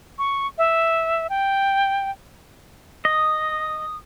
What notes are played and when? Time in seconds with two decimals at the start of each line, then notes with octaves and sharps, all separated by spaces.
0.19 C#6
0.58 E5
1.30 G5
3.05 D#5 D#6